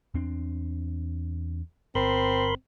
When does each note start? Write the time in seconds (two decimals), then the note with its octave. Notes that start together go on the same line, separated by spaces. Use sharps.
0.14 E2 C4 D4
1.95 G1 C4 A#4 B5 C6